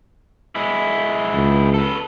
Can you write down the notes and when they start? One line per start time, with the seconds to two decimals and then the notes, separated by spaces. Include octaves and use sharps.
0.55 G#3 E4
1.34 C#2
1.74 A4 B4